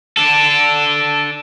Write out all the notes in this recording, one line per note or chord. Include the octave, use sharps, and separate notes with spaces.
D4 A4